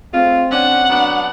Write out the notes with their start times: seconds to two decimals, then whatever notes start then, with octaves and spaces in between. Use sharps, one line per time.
0.14 A2 G#3 C4 F4
0.52 C#4 D4 F#5
0.90 F#3 B3 D4